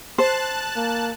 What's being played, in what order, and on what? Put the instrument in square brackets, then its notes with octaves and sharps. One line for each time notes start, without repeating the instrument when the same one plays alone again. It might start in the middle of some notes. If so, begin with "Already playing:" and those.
[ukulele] C5 [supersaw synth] A5 F#6
[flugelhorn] A#3